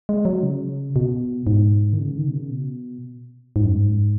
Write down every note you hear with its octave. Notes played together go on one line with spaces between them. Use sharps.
G#3
F#3
C#3
B2
G#2
D#3
C#3
D#3
B2
C#3
B2
G#2
F#2
G#2